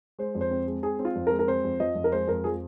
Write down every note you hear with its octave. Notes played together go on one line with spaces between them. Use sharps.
G#3 C5
F2
C5
C4
G#3
C4 G#4
C4
F4
F2
A#4
G#3
A#4
C4 C5
F2
F3 D#5
F2
A#4
G#3 C5
F2 A#4
F3 G#4